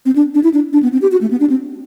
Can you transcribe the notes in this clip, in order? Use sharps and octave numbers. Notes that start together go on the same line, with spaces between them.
C4
D4
D4
E4
D4
D4
B3
C4
G4
F#4
A3
B3
D4
C4